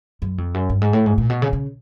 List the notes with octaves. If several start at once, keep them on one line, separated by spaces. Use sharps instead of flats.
F#2
F2
F#2
G2
G#2
A2
G#2
A#2
B2
C#3
C#3